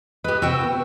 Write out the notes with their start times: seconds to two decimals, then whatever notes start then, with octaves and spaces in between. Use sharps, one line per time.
0.24 G4 B4 D#5
0.42 C3 F#4 G5 E6
0.63 B3